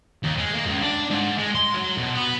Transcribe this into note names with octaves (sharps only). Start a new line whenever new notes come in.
D#2
G#3
A#3
C#2
D4
G#2
G#3
C6
F#3
B2
B3